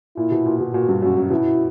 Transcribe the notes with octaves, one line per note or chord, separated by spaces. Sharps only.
A#2 E4
B2
A#2
B2
A#2 F#4
G2
F#2 F#4
F#2
B2 E4